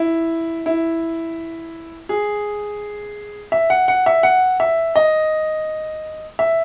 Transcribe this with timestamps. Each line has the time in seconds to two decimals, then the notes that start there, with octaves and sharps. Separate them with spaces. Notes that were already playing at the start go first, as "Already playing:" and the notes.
Already playing: E4
0.66 E4
2.09 G#4
3.52 E5
3.70 F#5
3.88 F#5
4.06 E5
4.23 F#5
4.60 E5
4.96 D#5
6.39 E5